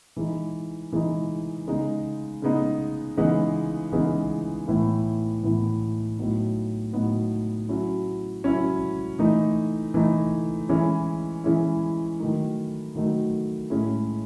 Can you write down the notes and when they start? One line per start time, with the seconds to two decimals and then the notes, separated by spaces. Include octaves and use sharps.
0.17 E3 G#3 D#4
0.93 E3 G#3 D#4
1.67 C#3 G#3 B3 D#4
2.42 C#3 G#3 B3 D#4
3.17 C#3 E3 G#3 B3 D#4
3.92 C#3 E3 G#3 B3 D#4
4.68 A2 E3 B3 E4
5.43 A2 E3 B3 E4
6.18 A2 F#3 B3 D#4
6.93 A2 F#3 B3 D#4
7.69 F#3 C#4 E4
8.44 F#3 C#4 E4
9.19 E3 A3 D#4
9.94 E3 A3 D#4
10.69 E3 G#3 C#4 E4
11.44 E3 G#3 C#4 E4
12.20 D#3 F#3 A3 D#4
12.95 D#3 F#3 A3 D#4
13.70 A2 G#3 C#4 E4